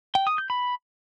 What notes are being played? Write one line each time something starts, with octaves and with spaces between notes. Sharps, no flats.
G5
D#6
G6
B5